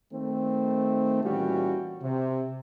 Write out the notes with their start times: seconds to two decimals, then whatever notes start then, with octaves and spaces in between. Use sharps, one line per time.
0.13 D#3 A3 C4
1.24 A#2 E3 G3 C#4 F#4 G4
2.02 C3